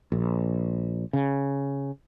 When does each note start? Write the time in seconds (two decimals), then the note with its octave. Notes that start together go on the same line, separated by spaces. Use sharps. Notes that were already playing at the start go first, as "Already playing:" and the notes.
0.12 A#1
1.13 C#3